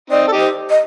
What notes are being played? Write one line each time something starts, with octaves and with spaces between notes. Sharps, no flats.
C4 D#4 D5
A4
D#4 G4
C5
D#5